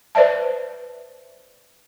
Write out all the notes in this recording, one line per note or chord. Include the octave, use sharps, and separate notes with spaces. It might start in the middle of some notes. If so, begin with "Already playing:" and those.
B4 C5 D5 E5 A5